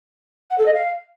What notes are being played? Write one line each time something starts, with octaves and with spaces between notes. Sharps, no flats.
F#5
A4
D#5
F5